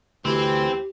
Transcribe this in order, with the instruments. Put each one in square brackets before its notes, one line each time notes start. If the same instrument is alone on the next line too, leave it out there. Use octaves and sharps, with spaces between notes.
[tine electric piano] D2 [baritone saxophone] E3 [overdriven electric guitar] C4 [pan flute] G4